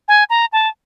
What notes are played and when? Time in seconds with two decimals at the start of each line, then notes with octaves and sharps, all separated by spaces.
0.08 G#5
0.30 A#5
0.53 A5